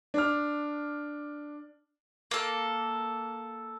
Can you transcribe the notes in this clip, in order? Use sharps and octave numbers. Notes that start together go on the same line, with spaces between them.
D4 F6
A#3 A4